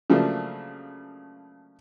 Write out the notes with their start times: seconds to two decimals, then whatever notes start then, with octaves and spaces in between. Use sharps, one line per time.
0.10 C#3 F3 F#3 A3 A#3 D4